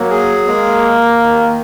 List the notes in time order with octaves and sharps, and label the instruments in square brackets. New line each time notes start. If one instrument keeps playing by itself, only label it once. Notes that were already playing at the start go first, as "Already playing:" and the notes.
Already playing: [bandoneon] F#3 [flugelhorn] A#3
[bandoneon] G#4
[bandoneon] G#3 [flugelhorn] A#3
[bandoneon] D#2
D#3